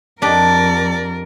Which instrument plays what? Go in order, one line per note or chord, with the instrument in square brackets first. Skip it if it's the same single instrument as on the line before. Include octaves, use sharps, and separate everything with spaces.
[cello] F2 A#4 [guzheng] D4 G4 D#5 [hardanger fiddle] D5